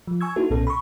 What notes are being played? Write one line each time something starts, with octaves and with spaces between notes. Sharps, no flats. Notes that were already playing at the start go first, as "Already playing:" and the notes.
F3
G#5 C#6 E6 G#6
A#3 D#4 E4 F#4 A4
B1 A#2 B3 C#4 A4
B5 C#6